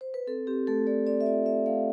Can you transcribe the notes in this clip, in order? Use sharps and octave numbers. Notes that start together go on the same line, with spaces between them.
C5
B4
C4 A4
C4 G4
A3 A4
A3 D5
C4 D5
E5
F4 D5
A3 E5
A3 F5